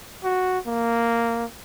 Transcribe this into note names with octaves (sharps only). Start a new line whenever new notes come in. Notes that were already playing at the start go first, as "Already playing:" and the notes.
F#4
A#3